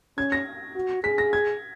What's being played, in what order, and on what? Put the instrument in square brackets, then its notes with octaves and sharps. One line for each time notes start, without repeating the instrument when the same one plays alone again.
[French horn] C#4 [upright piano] G#6
[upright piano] A#6
[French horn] F#4
[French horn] G#4 [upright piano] B6
[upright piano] A#6
G#6